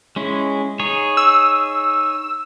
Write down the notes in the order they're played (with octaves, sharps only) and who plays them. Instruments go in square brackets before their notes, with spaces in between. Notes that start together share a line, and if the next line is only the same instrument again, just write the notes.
[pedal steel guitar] G#3 C#4 E4
D#4 G#4 C#5
[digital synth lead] E6